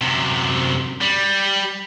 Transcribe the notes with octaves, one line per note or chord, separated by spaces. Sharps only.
F#2 C3
G3